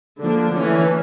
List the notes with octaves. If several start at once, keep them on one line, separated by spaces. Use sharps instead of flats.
D3 F3 A#3 D4
E3 A3 C#4